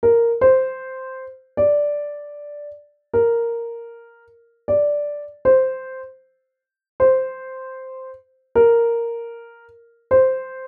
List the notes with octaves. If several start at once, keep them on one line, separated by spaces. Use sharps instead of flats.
A#4
C5
D5
A#4
D5
C5
C5
A#4
C5